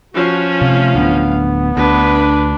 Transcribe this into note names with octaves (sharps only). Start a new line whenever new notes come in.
F3 C#4 F#4
C3 A3 F5
D1 D2 B3 D4
D2 D4 B4